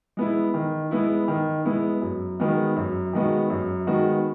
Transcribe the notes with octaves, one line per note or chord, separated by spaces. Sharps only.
G#3 B3 E4
D#3
G#3 B3 E4
D#3
G#3 B3 E4
F#2
D#3 G#3 B3 F#4
F#2
D#3 G#3 B3 F#4
F#2
D#3 G#3 B3 F#4